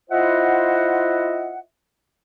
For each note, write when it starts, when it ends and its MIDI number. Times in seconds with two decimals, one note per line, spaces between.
0.10 1.57 64
0.10 1.57 65
0.10 1.57 72
0.10 1.57 75
0.10 1.57 76
0.10 1.57 78